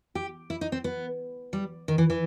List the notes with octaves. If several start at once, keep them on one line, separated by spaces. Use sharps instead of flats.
G4
E4
D#4
C4
B3
G3
D#3
E3
E3